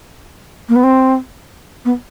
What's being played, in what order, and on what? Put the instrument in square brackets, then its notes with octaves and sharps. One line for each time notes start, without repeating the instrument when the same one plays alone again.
[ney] A#3
B3
C4
B3